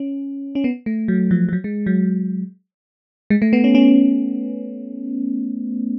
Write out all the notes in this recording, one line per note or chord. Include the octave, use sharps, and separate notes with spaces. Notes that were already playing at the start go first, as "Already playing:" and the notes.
Already playing: C#4
C#4
B3
A3
F#3
F3
F3
F#3
G#3
F#3
G#3
A3
B3
C#4
C#4